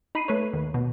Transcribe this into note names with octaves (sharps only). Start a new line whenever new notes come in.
D#4 B5 C7 D#7
A3 B4 C#5
D#2
B2